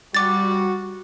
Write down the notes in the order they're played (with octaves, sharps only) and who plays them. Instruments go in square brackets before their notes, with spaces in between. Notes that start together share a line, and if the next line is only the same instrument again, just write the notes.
[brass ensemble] G3 F#4 [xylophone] D6 A6